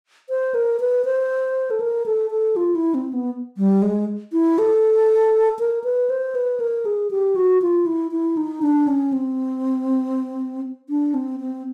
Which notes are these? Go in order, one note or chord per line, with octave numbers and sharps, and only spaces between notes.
C5
A#4
B4
C5
A4
A#4
A4
A4
F4
E4
C4
B3
G3
G#3
E4
A4
A#4
B4
C5
B4
A#4
G#4
G4
F#4
F4
E4
E4
D#4
D4
C#4
C4
D4
C4
C4